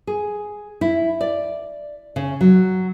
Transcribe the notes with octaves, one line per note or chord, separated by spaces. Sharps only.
G#4
E4
D5
C#3
F#3